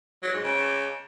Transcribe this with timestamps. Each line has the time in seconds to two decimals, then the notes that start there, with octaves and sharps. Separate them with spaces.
0.23 F#3
0.33 G#2
0.44 C#3